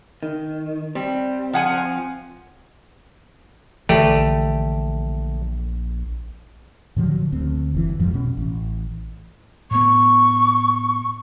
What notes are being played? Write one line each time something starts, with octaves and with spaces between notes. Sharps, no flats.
D#3
G3 C4
F3 F#5 G#5
A#1 D3 E3 A3 G4 D5
A2 D3 F3 F#3
D2 C4
F#1 E3
F2 G#2 F3
B2 C#4
A1
A2 B3 C#6